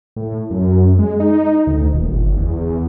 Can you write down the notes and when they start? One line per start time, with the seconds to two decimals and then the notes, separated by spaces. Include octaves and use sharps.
0.16 A2
0.50 F#2
0.99 G#3
1.20 D#4
1.67 D2
1.93 D#1
2.08 G1
2.37 E2